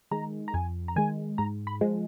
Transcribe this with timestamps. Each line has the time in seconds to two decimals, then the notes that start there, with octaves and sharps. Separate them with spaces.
0.11 D#3 G#3 A#5
0.48 A#5
0.54 F2 G#5
0.88 A#5
0.96 D#3 G#3 G#5
1.38 G#2 A#5
1.67 B5
1.81 F3 G#3